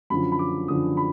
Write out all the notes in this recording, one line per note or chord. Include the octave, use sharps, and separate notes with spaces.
F#2 D3 F3 B5
B5
D6
F#2 D3 F3 D#6
B5